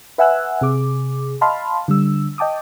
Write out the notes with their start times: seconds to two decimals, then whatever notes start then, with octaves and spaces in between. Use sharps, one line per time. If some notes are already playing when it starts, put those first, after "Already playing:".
0.18 B4 E5 F#5 G#5 E6 F#6
0.61 C3 G#4 D6
1.41 D#5 F5 A5 B5 C6 F6
1.88 D3 G3 E6
2.38 D#5 G5 A5 D6 D#6